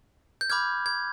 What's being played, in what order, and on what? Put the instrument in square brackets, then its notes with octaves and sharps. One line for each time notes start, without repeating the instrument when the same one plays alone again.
[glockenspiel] G6
B5 D6 F6 G#6
G#6